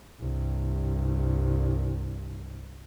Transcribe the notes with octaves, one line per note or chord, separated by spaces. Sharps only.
C2 G2